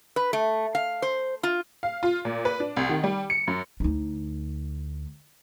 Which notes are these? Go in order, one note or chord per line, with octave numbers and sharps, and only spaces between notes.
B4
A3
F5
C5
F4
F5
F4
A#2
B4
D4
C2
D#3
G3
C#7
F#2
D2 D#4